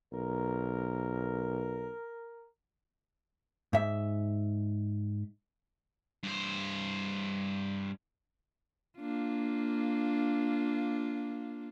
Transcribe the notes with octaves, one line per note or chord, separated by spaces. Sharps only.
B1 A#4
G#2 E5
G2 C5
A#3 D4 F4